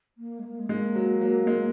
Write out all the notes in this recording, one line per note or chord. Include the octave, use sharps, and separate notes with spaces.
A#3
G#3
A#3
G#3
G#3 A#3
F#3
F#3
G#3